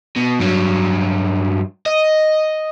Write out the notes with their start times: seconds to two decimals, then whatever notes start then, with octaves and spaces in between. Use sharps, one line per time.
0.16 B2
0.40 G2 F#3
1.86 D#5